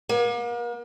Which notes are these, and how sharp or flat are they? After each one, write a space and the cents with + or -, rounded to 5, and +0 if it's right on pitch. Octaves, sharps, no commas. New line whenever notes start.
A#3 +40